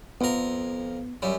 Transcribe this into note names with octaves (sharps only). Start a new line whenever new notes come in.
F2 B3 A#4
F#2 G3